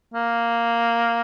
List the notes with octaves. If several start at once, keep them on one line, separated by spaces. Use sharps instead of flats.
A#3